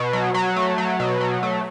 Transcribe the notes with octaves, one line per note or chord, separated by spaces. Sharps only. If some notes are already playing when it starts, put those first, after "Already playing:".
Already playing: B2
F#3
F#3
A3
F#3
B2
F#3
A3